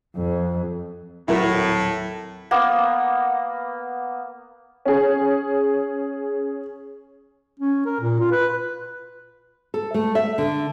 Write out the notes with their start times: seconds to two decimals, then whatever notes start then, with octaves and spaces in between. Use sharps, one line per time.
0.16 F2
1.28 D#1 A2 F#3 C4 E4 F#4 A#4
2.51 A#3 B3
4.85 C#4 G#4
7.60 C#4
7.86 A#4
8.00 A#2
8.20 F4
8.31 B4
9.74 A4
9.94 A3
10.15 E5
10.38 D3